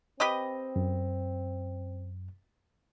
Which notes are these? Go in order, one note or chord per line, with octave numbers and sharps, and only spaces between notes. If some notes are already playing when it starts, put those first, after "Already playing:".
C4 G4 B4 D#5
F#2